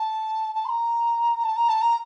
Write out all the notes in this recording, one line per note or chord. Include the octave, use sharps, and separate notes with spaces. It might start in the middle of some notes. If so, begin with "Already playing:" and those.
Already playing: A5
A5
C6
A#5
A5
A#5
A5
A#5